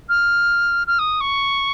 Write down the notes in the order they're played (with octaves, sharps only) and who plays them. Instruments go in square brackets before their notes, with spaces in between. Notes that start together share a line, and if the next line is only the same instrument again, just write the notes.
[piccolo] F6
F6
D#6
C#6